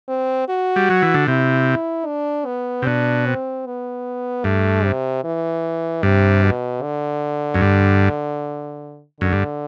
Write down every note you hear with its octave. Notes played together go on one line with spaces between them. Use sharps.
C4
F#4
G3
F#3
E3
D3
C3 E4
D4
B3
C3
B2 D4
C4
B3
G2 A3
C3
E3
G2 C3
B2
D3
F#2
G2
F#2 D3
G2